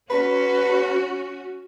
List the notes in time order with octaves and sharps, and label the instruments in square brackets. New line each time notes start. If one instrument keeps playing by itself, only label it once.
[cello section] C#4 F#4 [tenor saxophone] B4